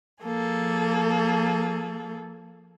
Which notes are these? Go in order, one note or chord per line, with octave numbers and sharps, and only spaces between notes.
F3 A#3 G#4 A4